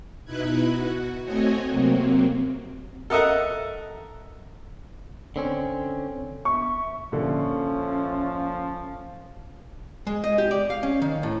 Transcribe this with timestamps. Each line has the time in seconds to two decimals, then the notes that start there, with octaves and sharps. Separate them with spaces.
0.25 B2 D#4 E4 B4 F#6 G#6
0.69 F#4
1.24 A3 C4 F#4 C#5 D#5 G#5
1.69 C3 F#3 A#3 C4
3.10 A4 A#4 D#5 E5 F#5
5.36 D3 C4 C#4
6.45 E5 C#6
7.12 A#1 D3 F3 C#4
10.07 G#3
10.24 D#5
10.38 G4
10.51 D5
10.70 F5
10.83 C#4
11.02 D#3
11.23 A2